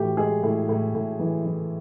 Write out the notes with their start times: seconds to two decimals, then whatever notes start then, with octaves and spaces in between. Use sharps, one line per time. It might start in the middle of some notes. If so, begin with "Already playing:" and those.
Already playing: A2 E3 F#4 G4
0.17 G#3 G#4
0.43 A2
0.69 A2
0.95 A2
1.19 E3
1.45 E3